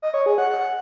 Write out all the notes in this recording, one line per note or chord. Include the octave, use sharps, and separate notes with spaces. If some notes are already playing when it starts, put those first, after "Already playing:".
D#5
C#5
G#4
F#5
F#5